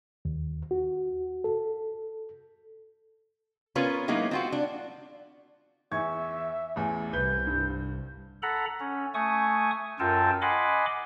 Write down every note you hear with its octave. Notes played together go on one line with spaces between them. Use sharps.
D#2
F#4
A4
B3 C#4 F4 A#4 B4 C#5
F#3 G#3 A#3 B3 D#4 E4
C4 F4 F#4
D4
E2 E5 C#6 G#6
A1 E2
C2 B4 G6 G7
G2
A4 F#5 A#5 B5
C#4
A3 G#5 C#6 D#6
F#2 F4 A4 A#4 G5 A5
D#5 F#5 G#5 B5 C6 D6